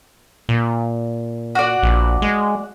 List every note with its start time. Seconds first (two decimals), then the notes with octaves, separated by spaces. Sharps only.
0.49 A#2
1.55 F#4 D5
1.82 A#1
2.22 G#3